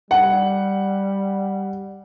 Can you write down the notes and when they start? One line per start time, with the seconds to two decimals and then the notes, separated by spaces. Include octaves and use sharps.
0.11 G3 F#5